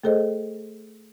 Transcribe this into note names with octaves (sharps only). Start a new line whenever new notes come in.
A3 G#4 A4 C5 D#5